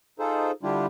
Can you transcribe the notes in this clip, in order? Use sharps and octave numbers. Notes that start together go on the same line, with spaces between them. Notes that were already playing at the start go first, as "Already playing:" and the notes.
D#4 F4 G#4 A4 C5
D3 G3 D4 E4 F4 G4